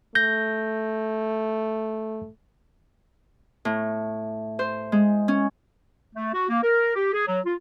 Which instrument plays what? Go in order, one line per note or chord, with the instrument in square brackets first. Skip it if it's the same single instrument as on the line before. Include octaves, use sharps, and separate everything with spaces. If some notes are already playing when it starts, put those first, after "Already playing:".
[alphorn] A3 [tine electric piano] G6 A#6
[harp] A2
C5
G#3
C#4
[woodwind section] A3
F#4
A#3
A#4
G4
G#4
F#3
F4